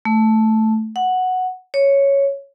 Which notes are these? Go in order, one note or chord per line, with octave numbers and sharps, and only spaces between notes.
A3
F#5
C#5